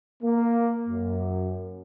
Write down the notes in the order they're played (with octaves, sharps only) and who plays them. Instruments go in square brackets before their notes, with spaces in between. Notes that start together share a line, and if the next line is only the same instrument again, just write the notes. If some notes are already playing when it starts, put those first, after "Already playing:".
[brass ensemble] A#3
F#2